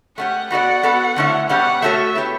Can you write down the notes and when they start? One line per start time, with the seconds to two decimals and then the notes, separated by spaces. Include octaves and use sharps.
0.17 A3 C#4 G4 F#5
0.51 B3 F#4 A4 D5 F#5
0.83 B3 F#4 A4
1.16 D3 A3 C#4 E4
1.49 B2 G3 C#4 G4 F#5
1.82 A3 C#4 F#4 A4 C#5 E5
2.15 B3 E4 G4 C#5